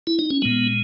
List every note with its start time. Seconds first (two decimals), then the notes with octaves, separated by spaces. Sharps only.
0.07 E4
0.19 D#4
0.30 C#4
0.42 A#2 G#3 B3